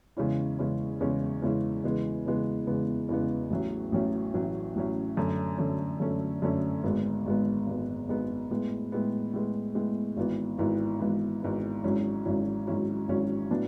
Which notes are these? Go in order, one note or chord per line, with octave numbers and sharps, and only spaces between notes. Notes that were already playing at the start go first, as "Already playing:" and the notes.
E2 C#3 G#3 C#4 E4
E2 C#3 G#3 C#4 E4
E2 C#3 G#3 C#4 E4
E2 C#3 G#3 C#4 E4
E2 C#3 E3 G#3 B3
E2 C#3 E3 G#3 B3
E2 C#3 E3 G#3 B3
E2 C#3 E3 G#3 B3
A1 A2 F#3 C#4
A1 A2 F#3 C#4
A1 A2 F#3 C#4
A1 A2 F#3 C#4
F#2 D3 A3 C#4
F#2 D3 A3 C#4
F#2 D3 A3 C#4
F#2 D3 A3 C#4
G#1 G#2 G#3 B3
G#1 G#2 G#3 B3
G#1 G#2 G#3 B3
G#1 G#2 G#3 B3
A2 G#3 B3
A2 G#3 B3
A2 G#3 B3
A2 G#3 B3
G#1 G#2 E3 B3 E4
G#1 G#2 E3 B3 E4
G#1 G#2 E3 B3 E4
G#1 G#2 E3 B3 E4
G#1 G#2 F#3 C#4 E4
G#1 G#2 F#3 C#4 E4
G#1 G#2 F#3 C#4 E4
G#1 G#2 F#3 C#4 E4
A2 F#3 B3 D4